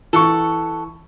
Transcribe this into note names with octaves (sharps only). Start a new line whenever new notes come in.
E3 A4 F#5 C#6